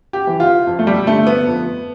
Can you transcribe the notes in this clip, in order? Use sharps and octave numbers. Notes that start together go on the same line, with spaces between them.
G4
E3
F4
F2
A3
G3
D3 A3
B3
F2